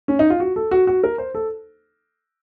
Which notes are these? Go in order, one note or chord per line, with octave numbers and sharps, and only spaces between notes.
C#4
D#4
F4
F#4
A4
F#4
F#4
A#4
C5
A4